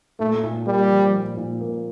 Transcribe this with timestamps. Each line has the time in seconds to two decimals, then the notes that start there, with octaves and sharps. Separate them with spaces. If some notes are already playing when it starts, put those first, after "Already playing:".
0.19 A#2 A3
0.43 A#2
0.66 G3 A#3
0.90 F3
1.14 A#2
1.37 A#2
1.61 A#3